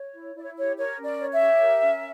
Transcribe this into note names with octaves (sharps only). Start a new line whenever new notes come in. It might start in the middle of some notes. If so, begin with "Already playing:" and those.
Already playing: C#5
E4
E4 D5
C#5
G4 C#5
A#4 C#5
C#4
D5
C#5
E5
G4
A#4
C#4